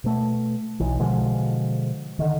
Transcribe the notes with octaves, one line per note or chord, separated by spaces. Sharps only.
B2 A3
B1 E3
B2 D3 F3 G#3
D3 D#3